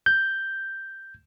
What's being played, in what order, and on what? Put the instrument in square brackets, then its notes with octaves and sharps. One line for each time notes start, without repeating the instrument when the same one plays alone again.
[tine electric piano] G6